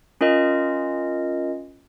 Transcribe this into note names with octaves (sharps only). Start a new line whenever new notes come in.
C#4 F4 A#4 D#5